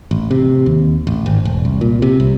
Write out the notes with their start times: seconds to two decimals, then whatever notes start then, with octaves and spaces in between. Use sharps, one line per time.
0.11 A1
0.31 C3
0.66 D#2
1.07 A1
1.26 G#1
1.45 E1
1.65 C2
1.81 A#2
2.02 C3
2.20 C2